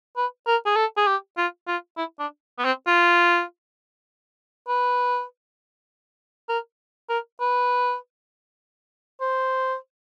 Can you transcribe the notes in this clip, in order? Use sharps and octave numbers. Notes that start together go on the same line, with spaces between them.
B4
A#4
G#4
A4
G#4
G4
F4
F4
E4
D4
B3
C4
F4
B4
A#4
A#4
B4
C5